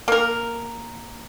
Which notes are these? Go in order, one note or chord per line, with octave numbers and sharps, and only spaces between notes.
A#3 A#4